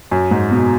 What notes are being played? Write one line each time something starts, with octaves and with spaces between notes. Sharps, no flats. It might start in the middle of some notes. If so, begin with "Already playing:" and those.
F#2
G#2
B2